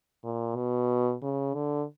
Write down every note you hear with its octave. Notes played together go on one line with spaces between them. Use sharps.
A#2
B2
C#3
D3